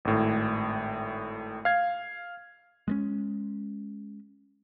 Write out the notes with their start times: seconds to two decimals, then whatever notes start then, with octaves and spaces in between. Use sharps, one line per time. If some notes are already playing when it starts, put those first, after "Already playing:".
0.05 G#1 A2
1.65 F5 G#6
2.88 G#3 A3 C#4